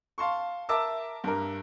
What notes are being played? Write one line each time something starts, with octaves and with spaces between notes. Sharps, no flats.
F5 A5 C6 C#6
A#4 E5 A5 D6 E6
G2 A#4